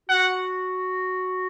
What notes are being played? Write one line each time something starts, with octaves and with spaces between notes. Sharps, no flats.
F#4 F#5